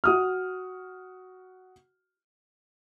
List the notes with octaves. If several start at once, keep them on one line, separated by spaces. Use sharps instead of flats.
F#4 D#6 F6